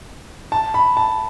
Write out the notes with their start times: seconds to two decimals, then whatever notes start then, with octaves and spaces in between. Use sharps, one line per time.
0.52 A5
0.74 B5
0.97 A5